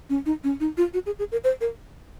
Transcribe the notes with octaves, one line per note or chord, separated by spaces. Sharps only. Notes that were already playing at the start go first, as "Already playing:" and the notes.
C#4
D#4
C#4
D#4
F4
F#4
G#4
G#4
A#4
C5
A#4